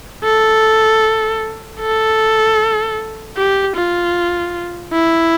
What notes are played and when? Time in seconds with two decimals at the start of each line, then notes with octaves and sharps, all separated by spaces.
0.24 A4
1.81 A4
3.37 G4
3.76 F4
4.93 E4